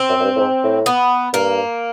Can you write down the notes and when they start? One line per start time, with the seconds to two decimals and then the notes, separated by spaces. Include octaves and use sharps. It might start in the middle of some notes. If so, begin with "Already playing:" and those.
Already playing: C4
0.09 F#2
0.20 F#2
0.24 G2
0.36 A2
0.40 G#2
0.64 A2
0.86 B3
1.33 G2 A#3